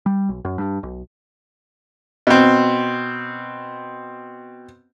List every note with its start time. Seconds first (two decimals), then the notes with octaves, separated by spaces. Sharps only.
0.06 G3
0.29 B1
0.45 F#2
0.58 G2
0.83 B1
2.27 B2 C4